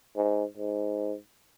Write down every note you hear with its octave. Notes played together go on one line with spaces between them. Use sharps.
G#2
G#2